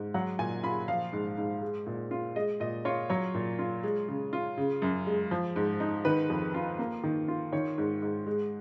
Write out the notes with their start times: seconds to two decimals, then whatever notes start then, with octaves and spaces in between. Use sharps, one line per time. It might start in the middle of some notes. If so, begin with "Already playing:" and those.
Already playing: G#2
0.14 F#3 F#5
0.39 A#2 G#5
0.64 F4 B5
0.88 F3 F5
1.13 G#2
1.38 G#2
1.62 G#3
1.87 A#2
2.11 F4
2.36 G#3 D#5
2.60 A#2 D#5
2.85 F4 C#5
3.10 F#3 C#5
3.34 A#2
3.59 F4
3.83 G#3
4.08 C#3
4.33 F4
4.58 C#3
4.82 F#2
5.07 G#3
5.31 F3
5.56 G#2
5.80 D#4
6.05 D#3 B4
6.30 F2
6.54 F4
6.79 A#3
7.04 D#3
7.28 F4
7.53 D#3 C#5
7.78 G#2
8.02 G#2
8.26 G#3